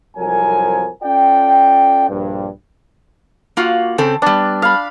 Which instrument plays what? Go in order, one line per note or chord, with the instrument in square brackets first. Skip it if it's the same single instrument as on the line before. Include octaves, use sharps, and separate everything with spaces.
[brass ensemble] C2 F2 F3 F#3 A#4 G#5
C#4 F4 A4 D5 G5
A#1 G2
[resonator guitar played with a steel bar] A#3 F4 F#4
C#3 C4 A4
[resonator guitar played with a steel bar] G3 B3 [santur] D4
[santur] F5 B5